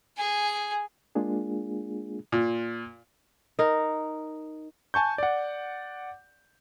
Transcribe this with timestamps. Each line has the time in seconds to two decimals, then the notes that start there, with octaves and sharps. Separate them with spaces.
0.17 G#4 G#5
1.15 G#3 A#3 D4 F4 G#4
2.32 A#2
3.59 D#4 A#4
4.94 G#5 A5 C#6 G6
5.18 D5 F#5